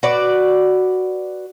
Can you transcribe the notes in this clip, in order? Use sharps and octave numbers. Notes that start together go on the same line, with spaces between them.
F#4 B4 D5